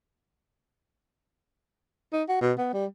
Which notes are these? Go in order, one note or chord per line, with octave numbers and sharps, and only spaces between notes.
D#4
F#4
B2
B3
G3